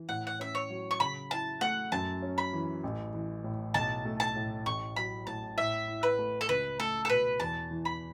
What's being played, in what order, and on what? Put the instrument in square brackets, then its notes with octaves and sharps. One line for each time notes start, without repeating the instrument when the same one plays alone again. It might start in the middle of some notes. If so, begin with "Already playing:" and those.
Already playing: [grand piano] E3
[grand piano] A2 [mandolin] F#5
[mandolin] F#5
[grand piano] C#4 [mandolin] E5
[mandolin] C#5
[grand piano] F#3
[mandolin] C#6
[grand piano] C#3 [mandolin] B5
[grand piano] E4 [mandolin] A5
[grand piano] A3 [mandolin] F#5
[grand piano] F#2 [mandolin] A5
[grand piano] C#4
[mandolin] B5
[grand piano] E3
A1
E3
A2
[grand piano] B1 [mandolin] A5
[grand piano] A3
[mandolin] A5
[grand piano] A2
[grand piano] A1 [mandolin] C#6
[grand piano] F#3 [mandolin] B5
[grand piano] A2 [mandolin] A5
[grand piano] A2 [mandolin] E5
[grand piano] E4
[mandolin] B4
[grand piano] A3
[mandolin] A4
[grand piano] C#2 [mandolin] B4
[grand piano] A3 [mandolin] A4
[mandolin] A4
[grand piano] B2 [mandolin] B4
[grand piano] E2 [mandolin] A5
[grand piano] E3
[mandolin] B5